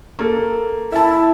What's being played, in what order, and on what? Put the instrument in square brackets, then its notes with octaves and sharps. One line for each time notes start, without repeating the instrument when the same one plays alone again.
[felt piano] A#3 A4
[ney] E4 [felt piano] E5 A5